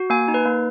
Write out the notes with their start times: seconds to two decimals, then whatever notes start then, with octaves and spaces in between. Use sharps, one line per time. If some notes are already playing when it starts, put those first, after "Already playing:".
Already playing: F#4
0.10 A#3 G#5
0.28 D#4
0.34 B4
0.45 A#3